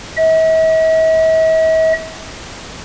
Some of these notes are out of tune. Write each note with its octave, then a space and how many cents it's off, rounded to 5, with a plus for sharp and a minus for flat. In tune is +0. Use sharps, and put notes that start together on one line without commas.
E5 -45